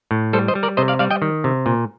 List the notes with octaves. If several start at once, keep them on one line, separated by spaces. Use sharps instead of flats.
A2
G3 A4 C5
C5 D#5
G3
A#4 D5
C3 C5 D#5
D5 F5
G3 D5 F5
D#5 G5
D#3
C3
A#2